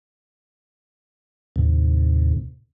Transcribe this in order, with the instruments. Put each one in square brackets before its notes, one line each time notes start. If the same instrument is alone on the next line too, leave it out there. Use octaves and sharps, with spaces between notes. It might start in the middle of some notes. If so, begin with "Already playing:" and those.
[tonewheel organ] D#2 A2 C3